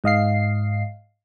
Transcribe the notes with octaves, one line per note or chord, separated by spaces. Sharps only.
G#2 D#5 F5 C7